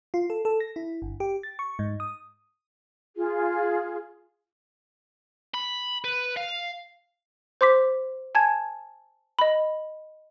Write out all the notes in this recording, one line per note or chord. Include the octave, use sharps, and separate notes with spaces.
F4
A4
A4
A#6
E4
G1
G4
A6
C#6
G#2
D#6
F4 G#4
B5
B4
F5
C5 C6 D6 B6
G#5 A5 G#6
D#5 B5